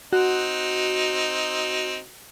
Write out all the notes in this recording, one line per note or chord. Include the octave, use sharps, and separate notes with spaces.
C4 D#4 F#4